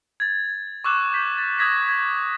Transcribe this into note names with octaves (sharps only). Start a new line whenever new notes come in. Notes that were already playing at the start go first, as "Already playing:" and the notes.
G#6 A6
C#6 D6 E6 F#6 E7
G6 B6
A6
D#6 F#6 G#6 A#6 B6
G#6